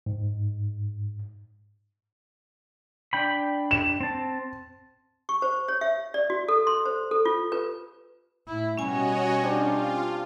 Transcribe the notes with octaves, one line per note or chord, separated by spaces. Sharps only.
G#2
D4 G5 B5
E7
C4 A5
C#6
C5
C#5
E5
D5
F#4
A4
C6
C5
A4
F4
B4
A2 E4
B2 G3 C#4 F#4 C#5 D#5 G#5
C4 D4 F4 G4